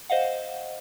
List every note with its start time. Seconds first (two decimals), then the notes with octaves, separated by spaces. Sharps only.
0.10 C5 D#5 F5 F#5